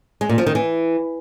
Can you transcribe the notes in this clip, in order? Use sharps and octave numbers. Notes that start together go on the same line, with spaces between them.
G#3
A#2
F3
D#3
E3